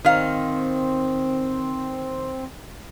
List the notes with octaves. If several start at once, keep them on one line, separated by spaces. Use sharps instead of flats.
D#3 C4 F5